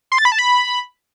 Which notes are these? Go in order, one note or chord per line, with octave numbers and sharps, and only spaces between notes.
C6
A6
B5
A5
B5